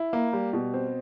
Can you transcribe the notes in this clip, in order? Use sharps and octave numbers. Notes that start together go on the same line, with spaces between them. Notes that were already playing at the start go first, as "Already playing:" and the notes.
Already playing: E4
A#3
G3
B2
C4